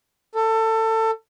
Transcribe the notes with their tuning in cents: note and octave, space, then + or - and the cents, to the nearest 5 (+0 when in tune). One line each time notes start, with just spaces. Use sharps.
A4 +25